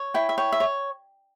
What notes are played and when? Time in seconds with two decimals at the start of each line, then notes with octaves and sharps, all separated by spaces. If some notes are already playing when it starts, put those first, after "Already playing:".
Already playing: C#5
0.14 E4 G5
0.29 E5
0.38 C#5 G5
0.52 E5
0.60 C#5